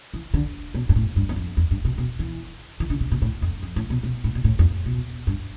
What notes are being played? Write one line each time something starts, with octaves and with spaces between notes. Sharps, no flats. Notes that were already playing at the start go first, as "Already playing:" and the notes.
E3
D3
B2
G2
A2
G2
E2
F2
E2
G2
B2
B2
E3
E3
D3
C3
B2
A2
F2
F2
A2
B2
B2
A2
B2
A2
F2
B2
G2